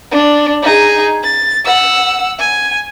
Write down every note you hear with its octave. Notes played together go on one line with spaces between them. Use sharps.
D4
D#4 G#4
A6
F#5 E6
G#5